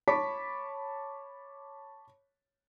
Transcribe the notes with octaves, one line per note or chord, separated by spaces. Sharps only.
C#5 A5 B5 C#6 D6 B6